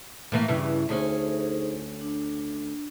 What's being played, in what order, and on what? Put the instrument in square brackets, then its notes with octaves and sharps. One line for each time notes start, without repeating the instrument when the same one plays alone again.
[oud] A2 E3 A#3
[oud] G2 C#3 E3 [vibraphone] E4
[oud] D2 C#4 [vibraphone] D#4 G#4 C5
[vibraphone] D4